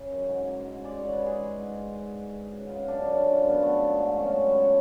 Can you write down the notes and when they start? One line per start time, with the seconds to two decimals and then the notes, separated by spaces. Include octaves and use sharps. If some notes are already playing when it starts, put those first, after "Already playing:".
Already playing: C#3
0.11 F#2
0.29 G#2
0.48 G#2
0.66 G#2
0.85 G#3 D5
0.99 G#2 C#5
1.13 B4
1.22 G#3 G#4
1.41 G#3
1.60 G#2
1.77 G#3
1.96 G#2
2.15 G#2
2.33 G#3
2.51 C#3 F#4
2.69 C#3 F4
2.88 F#2 D4
3.06 F#2 C#4
3.20 G#3 D4
3.34 F4
3.44 F#2
3.49 B3
3.62 A3 B3
3.81 G#2
3.99 G#2
4.17 F#2 C#4
4.31 G#3 A4
4.46 B4
4.54 F#2
4.60 C#5